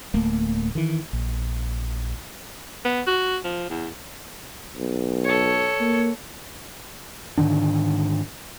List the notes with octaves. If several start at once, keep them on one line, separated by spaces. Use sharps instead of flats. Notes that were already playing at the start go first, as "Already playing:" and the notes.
D1 A3 A#3
D#3 E3
A#1
B3
F#4
F3
E2
B1
A4 C#5
A#3
G#2 D3 D#3 D4